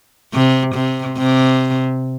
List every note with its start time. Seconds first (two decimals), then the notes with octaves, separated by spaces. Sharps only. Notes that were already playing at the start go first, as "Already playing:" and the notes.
0.33 C3
0.75 C3
1.17 C3